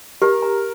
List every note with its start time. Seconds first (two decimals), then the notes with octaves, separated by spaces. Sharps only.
0.22 G4 A#4
0.42 A#5